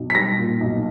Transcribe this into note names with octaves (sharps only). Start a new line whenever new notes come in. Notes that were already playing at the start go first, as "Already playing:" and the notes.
Already playing: B1
B6
G3 A#6
A#2
B1